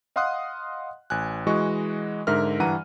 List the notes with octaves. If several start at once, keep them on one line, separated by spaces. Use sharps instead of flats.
D#5 F5 F#5 C6 D#6 F#6
A1 G#5 F#6
E3 G#3 F#4 D#5 C#6
G#2 D3 A#4 E5 F6
G2 E3 F#5 A#5 D#7